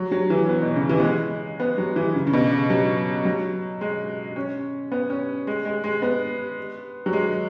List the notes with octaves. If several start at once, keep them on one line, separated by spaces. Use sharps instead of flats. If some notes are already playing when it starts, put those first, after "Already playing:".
Already playing: F#3
F#3
E3
B3
B2
C#3
E3
B3
G#3
B3
F#3
E3
C#3
C#3
B2
C#3
F#3
F#3
G#3
C#4
B3
C#4
G#3
G#3
G#3
B3
F#3
G#3